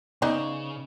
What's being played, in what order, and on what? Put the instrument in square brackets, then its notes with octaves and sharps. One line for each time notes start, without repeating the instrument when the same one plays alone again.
[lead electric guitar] C#3 [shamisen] B3 D#4 D5